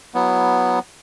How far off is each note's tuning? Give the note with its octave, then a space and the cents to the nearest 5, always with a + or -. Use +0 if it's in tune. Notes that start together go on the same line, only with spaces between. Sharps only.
F#3 +0 B3 +0 E4 +0